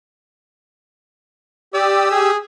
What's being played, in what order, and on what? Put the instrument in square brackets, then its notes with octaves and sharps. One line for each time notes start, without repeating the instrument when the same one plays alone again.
[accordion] G4 D#6 E6 [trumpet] D5
[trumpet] G#4